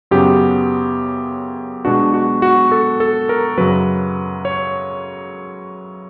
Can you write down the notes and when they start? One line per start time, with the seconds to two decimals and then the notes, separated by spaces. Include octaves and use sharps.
0.11 F#2 C#3 F#3 B3 G4
1.85 B2 G#3 B3 D4 F#4
2.14 F#4
2.42 F#4
2.72 A4
3.00 A4
3.29 A#4
3.58 F#2 C#3 F#3 B4
4.45 C#5